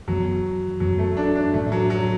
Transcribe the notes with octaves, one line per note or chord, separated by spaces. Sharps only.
F#2 E3 F#3 B3
F#2 E3 F#3 B3
A3
D4
D4
A2 E3 A3 D4
F#3
F#3